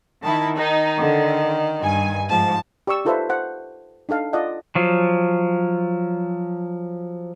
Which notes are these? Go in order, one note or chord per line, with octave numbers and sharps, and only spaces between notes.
D#3 E4 A5
D#3 D#4
D3
G2 G#5
G#2 F3 A5
G4 D5 C#6 E6
D#4 F4 A4 B4 C5 E5
C5 F#5
D4 D#4 A4 F5
F4 A4 D5 D#5 F#5 A5
F3 F#3